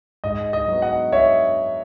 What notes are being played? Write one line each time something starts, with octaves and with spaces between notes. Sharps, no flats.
G#2 D#5
D#5
F#3 B3
D#5 F#5
C#5 E5